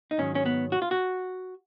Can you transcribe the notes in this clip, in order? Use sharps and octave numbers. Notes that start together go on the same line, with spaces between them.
D#4
G#2 D#3 F#3 C#4
C#4
B3
F#4
F4
F#4